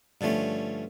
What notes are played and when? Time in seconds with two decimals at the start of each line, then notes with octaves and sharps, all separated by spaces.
0.21 G2 D3 F3 A3 C#4